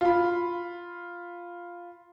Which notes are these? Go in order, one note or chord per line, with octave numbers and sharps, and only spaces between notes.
F4 B5